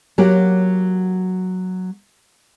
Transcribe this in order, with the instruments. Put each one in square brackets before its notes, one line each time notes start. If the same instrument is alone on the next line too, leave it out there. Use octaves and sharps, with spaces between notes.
[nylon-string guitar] F#3 A#3 F#4 G4